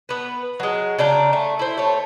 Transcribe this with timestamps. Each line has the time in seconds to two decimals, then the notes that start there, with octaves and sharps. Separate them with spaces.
0.09 B3 B4
0.60 F#3 G#3
0.99 C#3 D4 G5 A#5
1.33 A3
1.59 E4 C5
1.78 A3 C#5